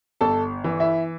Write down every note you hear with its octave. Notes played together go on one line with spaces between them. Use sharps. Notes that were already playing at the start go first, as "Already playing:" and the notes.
G1 A4 A5
E3
E4 E5